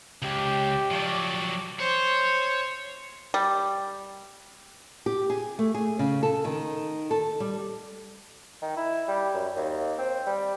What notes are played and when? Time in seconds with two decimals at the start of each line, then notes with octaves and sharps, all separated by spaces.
0.22 C#2 G4
0.91 F3 F#3 D5
1.79 C5 C#5
3.34 G3
5.06 G4
5.30 G#4
5.59 A3
5.74 G#4
5.99 C#3
6.23 A4
6.45 D#3
7.11 A4
7.40 G3
8.62 D#3
8.77 E4
9.08 G3
9.34 F#2
9.56 D#2
9.98 C4
10.26 G3